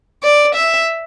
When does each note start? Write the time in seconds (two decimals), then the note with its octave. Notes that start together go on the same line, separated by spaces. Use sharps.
0.23 D5
0.56 E5